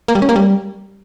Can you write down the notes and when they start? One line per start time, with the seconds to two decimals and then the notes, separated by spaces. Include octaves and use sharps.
0.08 A#3
0.15 G3
0.22 C#4
0.29 A#3
0.36 G3